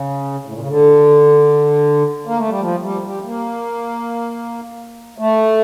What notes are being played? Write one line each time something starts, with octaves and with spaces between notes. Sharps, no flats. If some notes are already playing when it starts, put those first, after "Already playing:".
Already playing: C#3
A2
A#2
C#3
D3
A#3
A3
G3
F3
G3
G3
A#3
A3